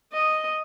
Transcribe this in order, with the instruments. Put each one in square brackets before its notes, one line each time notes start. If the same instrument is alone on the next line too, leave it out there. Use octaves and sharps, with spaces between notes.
[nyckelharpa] D#5